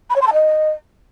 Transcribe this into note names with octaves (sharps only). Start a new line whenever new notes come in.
B5
C#5
C6
A5
D#5